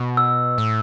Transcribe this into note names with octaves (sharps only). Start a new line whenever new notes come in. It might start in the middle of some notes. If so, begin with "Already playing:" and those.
Already playing: B2
E6
A2